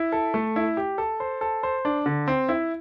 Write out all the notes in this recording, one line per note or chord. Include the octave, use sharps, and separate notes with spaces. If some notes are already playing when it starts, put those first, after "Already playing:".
Already playing: E4
A4
A3
E4
G4
A4
C5
A4
C5
D4
D3
C4
E4